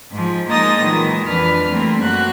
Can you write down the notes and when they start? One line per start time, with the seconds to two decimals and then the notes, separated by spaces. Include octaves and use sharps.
0.11 G#2 F3
0.48 G#3 A#3 D#4 D#6 A6 A#6
0.82 A#2 D#3 E3 F#3 G#3
1.25 F2 E3 D4 B4 F6
1.69 E3 G3 A3 A#3 C4
1.98 F#2 A#3 F#4 F#6